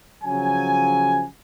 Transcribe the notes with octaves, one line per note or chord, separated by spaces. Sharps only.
C#3 F3 F#3 G#5